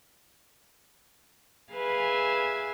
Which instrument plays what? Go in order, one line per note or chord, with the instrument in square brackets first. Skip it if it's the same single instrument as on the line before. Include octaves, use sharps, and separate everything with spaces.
[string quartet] G#4 B4 E5 F5 G#5